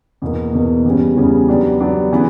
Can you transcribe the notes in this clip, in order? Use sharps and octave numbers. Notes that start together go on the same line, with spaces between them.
E2 B2 A#3
E2 B2 A#3
E2 C#3 G3 C#4
E2 C#3 G3 C#4
F#3 B3 D4 G4
F#3 B3 D4 G4
C#3 E3 B3